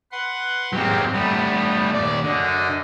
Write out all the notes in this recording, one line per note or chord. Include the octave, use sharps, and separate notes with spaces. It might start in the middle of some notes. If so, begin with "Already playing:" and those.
B4 F#5 C6
G#2 F#3 A#3 C4 G4
G3 A3 B3
D#2 D5
F#2 D3 D#5